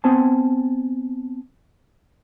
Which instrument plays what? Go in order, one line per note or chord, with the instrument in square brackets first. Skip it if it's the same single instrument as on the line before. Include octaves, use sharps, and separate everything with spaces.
[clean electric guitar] B3 C4 C5 G#5 A5